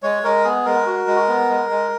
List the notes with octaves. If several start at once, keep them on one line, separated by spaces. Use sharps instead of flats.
G#3 C#5
G#3 A#4
B3 G#4
G#3 A#4
F#4
G#3
B3
G#3
G#3